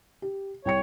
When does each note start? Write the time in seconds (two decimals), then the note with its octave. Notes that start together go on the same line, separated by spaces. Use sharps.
0.22 G4
0.65 C2 C#5 G5 C#7